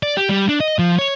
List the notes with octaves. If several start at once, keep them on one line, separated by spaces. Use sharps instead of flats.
D5
G4
G3
D4
D#5
F3
C#5